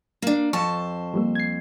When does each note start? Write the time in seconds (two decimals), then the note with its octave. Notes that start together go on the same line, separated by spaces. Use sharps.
0.22 A#3 D4
0.53 F2 C5 A5 C#6
1.14 F3 G3 A#3
1.35 G#6 C7